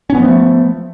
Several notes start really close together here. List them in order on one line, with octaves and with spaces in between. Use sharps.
C#4 B3 F3 A3